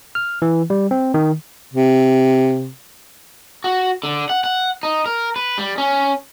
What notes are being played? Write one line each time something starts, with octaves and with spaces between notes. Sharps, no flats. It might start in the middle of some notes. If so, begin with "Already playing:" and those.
F6
E3
G3
C4
D#3
C3
F#4
D3
F#5
F#5
D#4
A#4
B4
G3
C#4